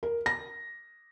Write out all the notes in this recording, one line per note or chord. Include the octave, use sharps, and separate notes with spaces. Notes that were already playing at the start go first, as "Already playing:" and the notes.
A#4
A#6